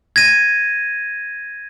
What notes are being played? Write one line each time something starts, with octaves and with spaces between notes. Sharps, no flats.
G#6 A#6 D#7